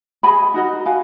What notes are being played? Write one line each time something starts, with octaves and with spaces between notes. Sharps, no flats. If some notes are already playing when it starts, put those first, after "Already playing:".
G#4 D#5 G#5 B5
D#4 F#4 A#4 D#5
F#4 A#4 F5 G#5